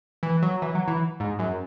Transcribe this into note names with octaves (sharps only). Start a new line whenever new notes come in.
E3
F#3
E3
F#3
E3
G#2
F#2